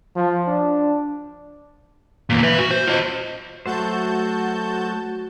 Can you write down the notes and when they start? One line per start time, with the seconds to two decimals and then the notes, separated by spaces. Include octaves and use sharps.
0.16 F3
0.47 D4
2.30 E2 A#2
2.43 B4 E5
2.58 F#4
2.71 C5
2.87 F4 D#5
3.66 F#3 A3 F#4 C5 A5 G6